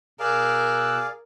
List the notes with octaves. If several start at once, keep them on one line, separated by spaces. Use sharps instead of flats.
B2 G#4 A#4 D5 F5 E6 F#6